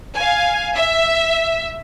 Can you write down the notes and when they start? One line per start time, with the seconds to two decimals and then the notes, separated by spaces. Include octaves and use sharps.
0.14 F5 G#5
0.76 E5